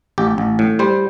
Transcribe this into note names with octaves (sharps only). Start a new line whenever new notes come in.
A1 G4
A1
A2
G3 C5